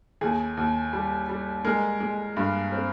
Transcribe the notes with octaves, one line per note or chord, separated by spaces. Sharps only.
D#2 G#4
D#2
G3
G3
G#3 A#4
G#3
G2
C4